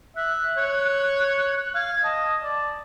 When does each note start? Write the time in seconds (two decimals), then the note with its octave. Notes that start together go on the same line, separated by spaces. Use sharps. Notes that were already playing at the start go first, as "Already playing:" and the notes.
0.16 E5 F#6
0.58 C#5
1.75 F5 G#6
2.04 D#5 A5
2.44 D5